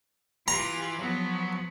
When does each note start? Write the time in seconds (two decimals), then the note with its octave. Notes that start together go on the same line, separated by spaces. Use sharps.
0.48 E3 F4 G4 A#5
0.99 F3 F#3 B3